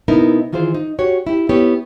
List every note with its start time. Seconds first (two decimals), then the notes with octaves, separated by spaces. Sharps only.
0.08 C3 B3 D#4 E4 A#4
0.53 D#3 E3 F4 G#4 C5
0.74 D#4
0.99 F#4 G4 C#5
1.27 E4 G4
1.49 B3 E4 G4 C#5